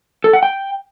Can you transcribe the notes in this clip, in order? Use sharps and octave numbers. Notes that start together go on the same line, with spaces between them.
A4
F#5
G5